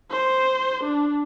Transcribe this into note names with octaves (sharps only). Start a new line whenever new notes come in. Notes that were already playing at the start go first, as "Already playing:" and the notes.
C5
D4